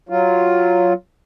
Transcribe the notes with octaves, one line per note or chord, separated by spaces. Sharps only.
F#3 F4